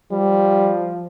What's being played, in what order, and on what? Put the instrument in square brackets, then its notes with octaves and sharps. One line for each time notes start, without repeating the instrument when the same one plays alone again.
[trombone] F3 [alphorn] G3